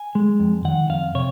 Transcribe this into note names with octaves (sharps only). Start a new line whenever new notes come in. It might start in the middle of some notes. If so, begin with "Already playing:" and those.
Already playing: G#5
G#3
F2
D#3 F#5
F2 F5
C3 C#5